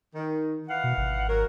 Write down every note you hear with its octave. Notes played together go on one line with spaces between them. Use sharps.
D#3
E3 F5 F#5
B2
G#1
F#3 F#4 A#4